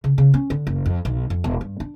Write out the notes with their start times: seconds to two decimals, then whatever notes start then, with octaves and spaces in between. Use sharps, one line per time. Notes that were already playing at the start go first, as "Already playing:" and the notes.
0.04 C#3
0.18 C#3
0.34 C#4
0.50 D3
0.67 F#1
0.86 F2
1.05 B1
1.30 F2
1.44 E1
1.61 G2
1.80 D4